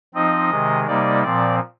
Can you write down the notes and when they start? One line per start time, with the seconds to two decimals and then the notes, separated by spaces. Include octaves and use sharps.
0.14 F3 C4 D#4 D#5
0.50 C3 D#3 G#3
0.87 C3 G3 A#3 D#4 D5
1.23 A#2 F3 C4 D5